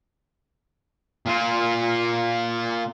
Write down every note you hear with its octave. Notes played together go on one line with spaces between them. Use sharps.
A#2 F4